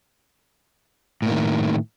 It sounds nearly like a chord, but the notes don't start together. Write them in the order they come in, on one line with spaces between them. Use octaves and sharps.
A2 A#3 D#3